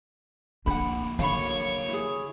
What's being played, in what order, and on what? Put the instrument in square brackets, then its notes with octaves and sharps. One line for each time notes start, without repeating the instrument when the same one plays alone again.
[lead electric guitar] F2 D3 [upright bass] A#3 D4 [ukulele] F#5 B5
[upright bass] D3 [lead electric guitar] F#3 A#3 [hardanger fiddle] C#5 C#6 [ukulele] F5 B5
[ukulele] E4 G#4